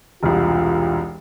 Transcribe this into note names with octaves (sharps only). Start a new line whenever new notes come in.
E1 C2 F4